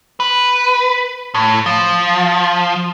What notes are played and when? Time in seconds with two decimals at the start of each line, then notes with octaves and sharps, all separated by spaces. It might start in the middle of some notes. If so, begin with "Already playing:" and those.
0.20 B4
1.35 A2
1.66 F3